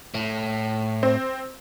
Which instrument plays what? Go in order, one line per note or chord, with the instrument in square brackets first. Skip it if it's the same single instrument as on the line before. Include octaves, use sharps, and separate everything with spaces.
[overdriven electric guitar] A2
[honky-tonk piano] C4